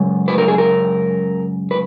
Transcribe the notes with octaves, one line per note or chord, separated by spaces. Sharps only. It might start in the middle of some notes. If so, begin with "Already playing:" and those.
Already playing: F#2 C#3 G#3
B4
A#4
G#4
A#4
B4